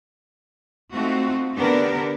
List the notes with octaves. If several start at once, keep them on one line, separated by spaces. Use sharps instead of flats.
A3 C4 D#4 F4 F#4
D3 B3 D4 G4 A#4